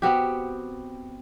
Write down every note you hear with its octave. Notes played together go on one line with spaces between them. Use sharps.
B3 C4 F#4 G4